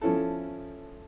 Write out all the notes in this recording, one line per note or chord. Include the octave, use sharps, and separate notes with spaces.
F3 C#4 E4 A4